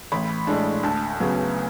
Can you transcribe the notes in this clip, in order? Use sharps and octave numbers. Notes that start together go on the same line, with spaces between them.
A1 B5
A2 G#3 D4
D2 A5
C#3 F#3 B3